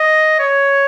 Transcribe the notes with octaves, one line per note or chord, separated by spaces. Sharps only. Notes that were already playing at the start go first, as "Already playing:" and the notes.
Already playing: D#5
C#5